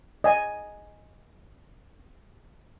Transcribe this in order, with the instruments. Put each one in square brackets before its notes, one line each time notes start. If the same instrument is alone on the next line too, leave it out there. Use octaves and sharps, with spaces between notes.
[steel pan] D#5 G#5